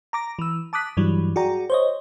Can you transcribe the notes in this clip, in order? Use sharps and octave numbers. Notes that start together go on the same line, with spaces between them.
A#5 D6 A#6
E3 E6
A5 D6 D#6 F#6 B6
G2 E3 F#3 G3
F#4 G#4 D5 G5 A#5
C5 C#5 D#5